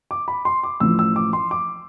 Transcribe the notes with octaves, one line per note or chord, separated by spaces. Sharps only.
D6
B5
C6
D6
A1 A2 F3 E6
E6
D6
C6
D6